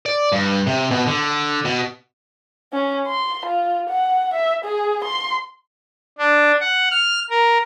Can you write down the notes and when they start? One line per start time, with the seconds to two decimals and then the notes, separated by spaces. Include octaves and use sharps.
0.06 D5
0.32 G2
0.67 C3
0.91 B2
1.07 D3
1.65 B2
2.73 C#4
3.07 C6
3.46 F4
3.89 F#5
4.34 E5
4.64 G#4
5.04 C6
6.18 D4
6.60 F#5
6.91 F6
7.30 A#4